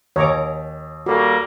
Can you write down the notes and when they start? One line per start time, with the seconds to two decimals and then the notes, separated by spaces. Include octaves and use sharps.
0.16 D#2 C#5 A#5 D6
1.06 G3 A#3 F#4 A4